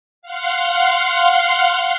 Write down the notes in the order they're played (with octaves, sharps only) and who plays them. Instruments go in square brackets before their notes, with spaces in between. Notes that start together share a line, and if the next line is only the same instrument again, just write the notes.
[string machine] F5 F#5 C6